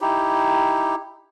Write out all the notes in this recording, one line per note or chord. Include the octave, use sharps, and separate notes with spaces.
D#4 E4 G4